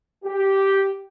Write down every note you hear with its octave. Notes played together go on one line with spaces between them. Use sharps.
G4